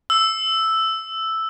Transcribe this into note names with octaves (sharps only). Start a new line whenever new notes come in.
E6